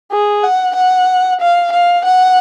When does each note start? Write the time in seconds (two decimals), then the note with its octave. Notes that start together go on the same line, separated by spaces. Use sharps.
0.11 G#4
0.44 F#5
0.76 F#5
1.41 F5
1.72 F5
2.05 F#5